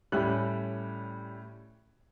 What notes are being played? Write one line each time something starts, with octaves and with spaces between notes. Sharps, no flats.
A2 G3 C#4 F#6